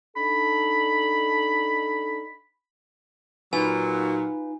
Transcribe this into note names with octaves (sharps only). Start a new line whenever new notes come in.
D4 D#4 A4 B5
A#2 F#3 D#4 F4 B4 G#5